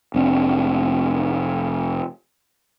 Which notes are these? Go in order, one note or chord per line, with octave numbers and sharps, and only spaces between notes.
F1 C4 D4